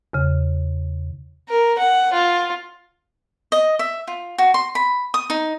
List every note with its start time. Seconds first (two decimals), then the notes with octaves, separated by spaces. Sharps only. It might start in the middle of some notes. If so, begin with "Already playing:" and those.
0.13 E2 C#3
1.49 A#4
1.78 F#5
2.13 F4
3.52 D#5
3.79 E5
4.08 F4
4.38 F#4
4.54 C6
4.75 B5
5.14 D#6
5.30 D#4